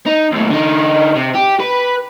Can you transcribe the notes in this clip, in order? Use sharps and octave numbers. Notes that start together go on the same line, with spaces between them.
D#4
D#2 A2
D3 D#4
C3
G4
B4